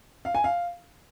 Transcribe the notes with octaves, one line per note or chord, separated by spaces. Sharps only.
F5
G#5
F5